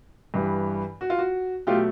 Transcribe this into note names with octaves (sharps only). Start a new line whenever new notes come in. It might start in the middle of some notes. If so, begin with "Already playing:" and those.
G2 E3 G3
F#4
F4
F#4
B2 F#3 A3 F4 G4